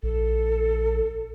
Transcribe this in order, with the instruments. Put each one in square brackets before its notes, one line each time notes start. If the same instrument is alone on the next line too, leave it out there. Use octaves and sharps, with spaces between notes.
[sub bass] A#1 [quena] A4